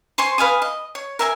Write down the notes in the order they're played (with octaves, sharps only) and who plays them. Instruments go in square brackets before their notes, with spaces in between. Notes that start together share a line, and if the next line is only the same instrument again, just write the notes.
[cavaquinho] C5 G#5 C6 C#6
B4 F5 G#5 D#6
D#5
C#5
A#4 E5 G#5